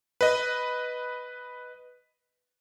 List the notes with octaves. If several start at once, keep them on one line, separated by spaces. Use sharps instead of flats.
B4 D#5